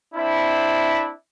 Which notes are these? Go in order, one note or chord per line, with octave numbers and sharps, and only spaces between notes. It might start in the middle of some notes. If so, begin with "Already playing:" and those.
C4 D4 E4